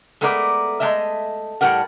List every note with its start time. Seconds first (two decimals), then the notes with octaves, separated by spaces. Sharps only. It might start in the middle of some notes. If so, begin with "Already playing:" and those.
0.21 G#3 A3 B3 A#4 D5
0.80 G#3 A3 D#5 E5
1.61 A2 G3 A#4 F#5